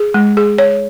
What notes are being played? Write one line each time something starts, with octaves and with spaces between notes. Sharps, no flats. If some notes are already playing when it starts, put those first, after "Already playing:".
Already playing: G#4
G#3
G#4
C#5